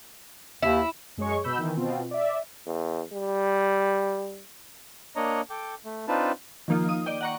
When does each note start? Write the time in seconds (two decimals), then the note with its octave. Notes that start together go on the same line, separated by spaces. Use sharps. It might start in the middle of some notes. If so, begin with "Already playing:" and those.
0.63 D#2 E4
1.17 F#2 G#3 G#4 C#5 C#6
1.44 B2 B5 E6 G6
1.58 D#3 E3
1.77 B2 C4 F4
2.11 D5 E5
2.66 E2
3.13 G3
5.16 A#3 D4 C#5 D#5 A#5
5.50 A4 G5 D6
5.85 A3
6.08 C4 D4 D#4 F4 B4 A5
6.68 D#3 F3 A#3 D#4 F4
6.89 D#6
7.06 D5 D#5 G5
7.21 F#5 A#5 C#6